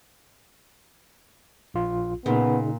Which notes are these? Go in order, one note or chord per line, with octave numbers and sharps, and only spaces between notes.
A#1 F4
A#2 C#3 B3 D#4